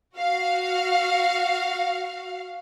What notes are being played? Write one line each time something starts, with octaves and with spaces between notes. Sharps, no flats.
F#4 F5